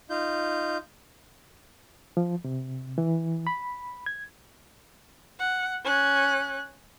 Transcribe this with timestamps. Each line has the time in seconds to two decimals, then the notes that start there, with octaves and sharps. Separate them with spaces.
0.10 D#4 F4 G6
2.17 F3
2.45 C3
2.98 E3
3.47 B5
4.06 G#6
5.40 F#5
5.84 C#4 F#6